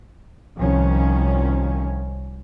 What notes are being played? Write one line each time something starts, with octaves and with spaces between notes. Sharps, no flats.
C2 D#3 F3 C#4